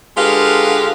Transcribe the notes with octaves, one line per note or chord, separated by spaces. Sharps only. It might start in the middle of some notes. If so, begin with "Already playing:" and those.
D3 G#3 F4 G4 B4 F5